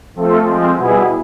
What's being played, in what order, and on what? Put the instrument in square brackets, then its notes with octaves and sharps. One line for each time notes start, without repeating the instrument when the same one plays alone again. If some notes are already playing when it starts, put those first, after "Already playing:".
[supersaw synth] F3 A3 C4 F4 A4
F3 G#3 C4
B2 G3 B3 E4 G#4